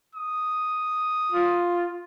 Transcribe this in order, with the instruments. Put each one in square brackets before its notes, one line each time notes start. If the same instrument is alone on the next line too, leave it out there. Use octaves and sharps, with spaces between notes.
[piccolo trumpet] D#6
[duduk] F4